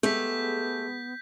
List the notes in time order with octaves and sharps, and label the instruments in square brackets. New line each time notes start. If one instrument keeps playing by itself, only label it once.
[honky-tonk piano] G#3 [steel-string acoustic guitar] A3 G4 [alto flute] B3 [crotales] G6 B6